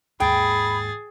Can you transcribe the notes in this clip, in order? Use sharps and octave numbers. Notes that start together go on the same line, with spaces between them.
D#2 G#2 G#4 G5 B5 A6